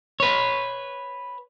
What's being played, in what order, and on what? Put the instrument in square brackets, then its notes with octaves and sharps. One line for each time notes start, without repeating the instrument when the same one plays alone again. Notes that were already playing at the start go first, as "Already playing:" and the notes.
[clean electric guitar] B4 C#5